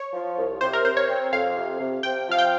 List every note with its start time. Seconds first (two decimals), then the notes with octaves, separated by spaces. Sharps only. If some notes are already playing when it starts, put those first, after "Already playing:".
Already playing: C#5
0.13 F3
0.37 C2
0.61 C3 C5
0.73 A#4
0.84 C3 C5
0.97 C#5
1.09 C4
1.32 F2 F5
1.56 C3
1.79 C3
2.03 C3 G5
2.28 F3 F5
2.38 G5